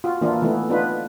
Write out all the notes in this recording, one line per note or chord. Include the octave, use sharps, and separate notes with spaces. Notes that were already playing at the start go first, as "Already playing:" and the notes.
F4 F#4
E3 A#3 D4 E4 F4
E3 A3 B3 E4
B3 D4 D#4 F4 B4